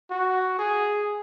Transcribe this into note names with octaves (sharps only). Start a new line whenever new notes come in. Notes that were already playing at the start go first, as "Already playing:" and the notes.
F#4
G#4